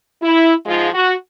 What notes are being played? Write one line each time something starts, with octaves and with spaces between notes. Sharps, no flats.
E4
G#2 F3 G#3 F4
F#4